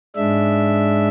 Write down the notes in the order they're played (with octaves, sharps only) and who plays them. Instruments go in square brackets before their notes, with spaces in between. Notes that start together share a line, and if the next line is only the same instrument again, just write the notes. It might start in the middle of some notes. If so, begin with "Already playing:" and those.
[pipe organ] G#2 G#3 D4 E5